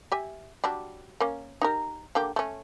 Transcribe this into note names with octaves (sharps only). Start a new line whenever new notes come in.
G4 E5 G#5
F#3 G3 D4
A#3 C#4
D#4 G4 A#4
D3 A#3 G4
A3 C#4